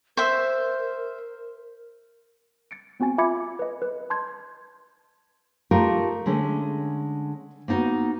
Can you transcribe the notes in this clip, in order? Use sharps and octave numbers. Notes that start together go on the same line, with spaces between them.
A#4 C5 E5
A6 C#7 D7
B3 C4 F#4 G#5 A6
F4 E5 B5 D6 G#6 C#7
B4 D#5
B4
A5 C6 G6 G#6
A3 D#4 F4 G4 A#4
D3 G#3 A3 C#4
A#3 B3 D#4 F4 F#4